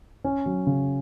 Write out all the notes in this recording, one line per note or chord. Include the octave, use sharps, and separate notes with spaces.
C#4
F#3
C#3